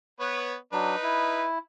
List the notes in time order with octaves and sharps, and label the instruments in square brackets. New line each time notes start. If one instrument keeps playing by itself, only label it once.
[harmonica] B3 B4 C#5
[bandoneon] F#3 D4 [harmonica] D#4 B4
[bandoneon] E4